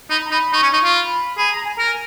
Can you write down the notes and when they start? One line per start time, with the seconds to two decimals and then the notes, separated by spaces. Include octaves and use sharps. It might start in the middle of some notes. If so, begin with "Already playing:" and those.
0.10 D#4 B5
0.25 A#5
0.31 D#4 B5
0.53 D#4 C#6
0.63 C#4
0.73 D#4 C#6
0.84 F4
0.95 B5
1.37 G#4 B5
1.51 A#5
1.64 G#5
1.75 A#4 A#5
1.85 G#5